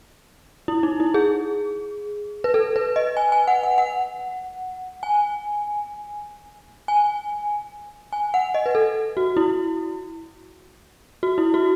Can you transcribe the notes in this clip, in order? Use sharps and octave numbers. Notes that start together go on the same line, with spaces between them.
E4
D#4
E4
G#4
B4
A4
B4
D#5
G#5
G#5
F#5
F#5
F#5
G#5
G#5
G#5
F#5
D#5
B4
A4
F#4
E4
F#4
E4
F#4